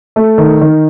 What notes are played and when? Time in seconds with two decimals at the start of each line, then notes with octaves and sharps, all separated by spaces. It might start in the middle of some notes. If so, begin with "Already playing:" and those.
0.16 A3
0.38 D#3
0.61 D#3